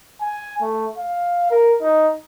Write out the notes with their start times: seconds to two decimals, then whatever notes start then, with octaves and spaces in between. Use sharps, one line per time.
0.21 G#5
0.61 A3
0.98 F5
1.51 A#4
1.81 D#4